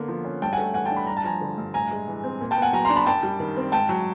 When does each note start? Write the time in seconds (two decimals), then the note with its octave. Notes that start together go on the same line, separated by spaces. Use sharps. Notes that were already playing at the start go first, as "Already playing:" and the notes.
Already playing: D3 A#3 B3
0.08 F3
0.25 C#4
0.42 G2 G5 A5
0.53 F#5 G#5
0.58 A3
0.74 E3 F#5 G#5
0.86 G5 A5
0.91 D4
0.96 B5
1.07 G2 A#5
1.17 A5
1.24 F3 G#5 A#5
1.41 D3
1.58 G2
1.74 A2 G#5 A#5
1.91 G#3
2.08 E3
2.24 C4
2.41 A#2
2.51 G5 A5
2.56 B3
2.62 F#5 G#5
2.73 F#3 G#5 A#5
2.85 A#5 C6
2.90 D4
2.96 A5 B5
3.06 F#2 G5 A5
3.23 G3
3.40 D#3
3.57 C4
3.72 G#2 G5 A5
3.89 F#3